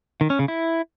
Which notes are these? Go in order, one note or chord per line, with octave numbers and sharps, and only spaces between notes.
D#3
C#4
C#3
E4